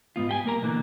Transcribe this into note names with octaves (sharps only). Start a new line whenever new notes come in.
G#2 B3 F4
G4 G5 G#5
B1 A#3 A#4 A#5
B2 D3 E3 A#3